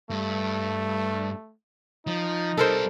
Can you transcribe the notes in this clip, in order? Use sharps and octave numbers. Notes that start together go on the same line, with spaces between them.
G2 A3
F3 D#4
G3 C4 A4 A#4 C5